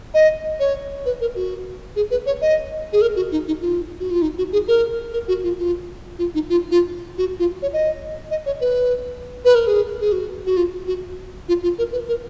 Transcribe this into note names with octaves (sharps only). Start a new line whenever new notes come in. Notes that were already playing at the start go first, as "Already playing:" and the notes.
D#5
C#5
B4
A#4
F#4
G#4
B4
C#5
D#5
G#4
A#4
F#4
D#4
D#4
F4
F#4
F4
D#4
F#4
G#4
A#4
A#4
F#4
F4
F4
F4
D#4
F4
F4
F#4
F4
C#5
D#5
D#5
C#5
B4
B4
A#4
G#4
G#4
F#4
F#4
F4
F#4
F4
F4
A#4
B4
A#4